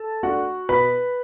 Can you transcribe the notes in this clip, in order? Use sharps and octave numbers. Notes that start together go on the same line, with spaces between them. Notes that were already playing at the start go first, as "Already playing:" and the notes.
Already playing: A4 A5
A3 D4 F#4 F#5
B2 B4 B5